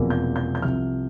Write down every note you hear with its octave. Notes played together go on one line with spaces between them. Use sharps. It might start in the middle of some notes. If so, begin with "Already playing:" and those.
Already playing: E1 E2 C3 F3 A#3
G6
G6
G6
C2 C3 F3 F6